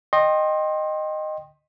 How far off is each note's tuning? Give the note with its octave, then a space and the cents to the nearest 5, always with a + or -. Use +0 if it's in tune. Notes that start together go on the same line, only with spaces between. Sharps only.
D#5 -10 G5 +0 C6 +30